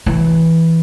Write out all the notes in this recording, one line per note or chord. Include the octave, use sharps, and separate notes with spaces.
E3